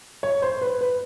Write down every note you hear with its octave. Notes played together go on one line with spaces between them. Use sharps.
C#5
C5
B4
B4